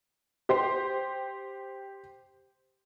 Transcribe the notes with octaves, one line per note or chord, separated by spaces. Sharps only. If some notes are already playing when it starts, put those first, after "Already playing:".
G4 C5